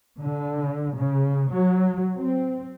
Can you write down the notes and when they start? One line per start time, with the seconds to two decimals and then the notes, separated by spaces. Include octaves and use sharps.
0.19 D3
0.96 C#3
1.52 F#3
2.17 C4